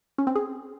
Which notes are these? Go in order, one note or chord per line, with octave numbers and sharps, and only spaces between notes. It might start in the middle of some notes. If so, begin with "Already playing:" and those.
C#4
C4
G#4